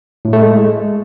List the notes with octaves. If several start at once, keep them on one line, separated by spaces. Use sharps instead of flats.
A2
A3
G#3